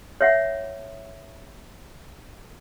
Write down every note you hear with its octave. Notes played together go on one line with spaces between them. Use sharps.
C#5 E5 F#5